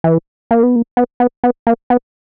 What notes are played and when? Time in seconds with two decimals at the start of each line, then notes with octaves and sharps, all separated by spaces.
0.04 E3
0.51 A#3
0.63 B3
0.76 A#3
0.97 B3
1.20 B3
1.44 B3
1.67 A#3
1.90 B3